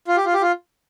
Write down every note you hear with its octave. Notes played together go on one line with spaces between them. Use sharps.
F4
G4
F4
G4
F4